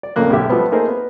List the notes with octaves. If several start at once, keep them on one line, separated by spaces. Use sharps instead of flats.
D5
F2 A2 C#3 A#3 F#6
B1 G#2 D3 G4 E5
F3 G3 A3 B3
A3 A#3 D#4 G#4 A#4 C5
B3